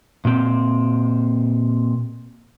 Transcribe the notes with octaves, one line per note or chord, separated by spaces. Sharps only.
A#2 C4